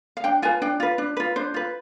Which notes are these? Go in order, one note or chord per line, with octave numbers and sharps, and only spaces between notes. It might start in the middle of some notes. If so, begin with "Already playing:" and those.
F5
D4 G5
F4 B4 G#5
D4 G5
F4 B4
D4
F4 B4
D4 C5
F4 B4